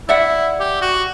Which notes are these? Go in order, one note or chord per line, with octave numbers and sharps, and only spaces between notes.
E4 D5 E5 F#5
G4
F#4